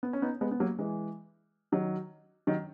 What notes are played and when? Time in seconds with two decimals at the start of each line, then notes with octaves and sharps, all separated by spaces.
0.03 B3
0.13 C#4
0.22 B3 D#4
0.41 G#3 B3
0.51 B3
0.60 F#3 A#3
0.79 E3 G#3
1.72 D#3 F#3
2.47 D#3 F#3